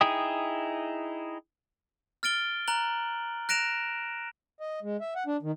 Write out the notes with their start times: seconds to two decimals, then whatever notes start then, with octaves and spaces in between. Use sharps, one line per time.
0.01 D#4 E4 G#4 G5 D#6
2.23 F6 A6 D7 G7
2.68 A#5 F#6 F#7
3.49 F#6 A#6 D7 E7 F7
4.60 D#5
4.83 G#3
5.01 E5
5.15 F#5
5.27 D4
5.43 D#3